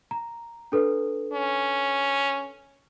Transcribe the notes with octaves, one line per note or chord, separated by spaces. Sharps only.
A#5
D4 A4 B4
C#4